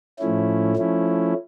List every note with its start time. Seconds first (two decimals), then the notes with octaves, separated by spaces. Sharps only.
0.19 A2 F3 A3 C#4 E4
0.76 F3 A3 C#4 E4